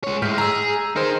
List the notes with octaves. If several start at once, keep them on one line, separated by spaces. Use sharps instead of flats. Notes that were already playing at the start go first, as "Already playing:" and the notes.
G#3 C#5
A2 G#3 F6 G6 B6
G#4 A#5 E6
D#4 G#4 A#4 C5 F6